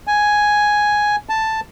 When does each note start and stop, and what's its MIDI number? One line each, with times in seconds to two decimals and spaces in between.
0.07 1.16 80
1.29 1.60 81